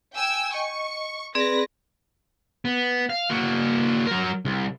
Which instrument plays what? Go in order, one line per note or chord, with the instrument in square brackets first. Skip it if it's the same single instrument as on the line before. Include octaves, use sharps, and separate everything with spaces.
[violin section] G5 G#5 E6
[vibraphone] D#5 [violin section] C#6
[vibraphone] C4 G#4 D5 [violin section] B4 A#6
[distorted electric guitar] B3
F5
A#3 F#4
F#3 A#4
C2